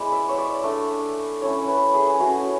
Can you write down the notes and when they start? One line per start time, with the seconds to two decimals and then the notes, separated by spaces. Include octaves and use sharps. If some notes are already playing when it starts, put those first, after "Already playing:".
Already playing: G#3 B3 E4 D5
0.12 E5
0.29 C#5
0.38 D5
0.63 A3 D4
1.41 A3 C#4 E4 C#5
1.68 B4
1.94 G#4
2.19 A3 C#4 E4 F#4